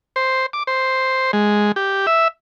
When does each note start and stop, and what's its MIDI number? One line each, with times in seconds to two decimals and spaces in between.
0.16 0.46 72
0.53 0.63 86
0.67 1.31 72
1.33 1.72 56
1.76 2.06 67
2.07 2.28 76